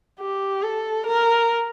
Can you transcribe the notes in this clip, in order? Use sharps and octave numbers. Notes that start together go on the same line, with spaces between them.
G4
A4
A#4